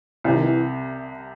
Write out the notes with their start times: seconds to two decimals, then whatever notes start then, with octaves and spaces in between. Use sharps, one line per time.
0.24 C2 C3 E3
0.34 D#3
0.43 E3